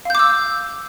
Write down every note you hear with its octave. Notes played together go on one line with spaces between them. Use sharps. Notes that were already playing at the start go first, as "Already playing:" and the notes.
F5 D6 E6 G6